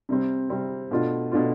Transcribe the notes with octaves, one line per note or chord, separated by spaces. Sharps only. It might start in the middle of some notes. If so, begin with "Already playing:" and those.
C3 G3 C4
C3 G3 C4
B2 A3 D4 F4
B2 A3 D4 F4